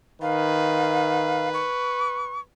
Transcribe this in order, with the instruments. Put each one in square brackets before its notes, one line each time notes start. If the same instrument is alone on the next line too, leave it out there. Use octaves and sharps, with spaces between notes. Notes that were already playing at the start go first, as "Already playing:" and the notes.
[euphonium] D#3 [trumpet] B4 [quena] F5
[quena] C#6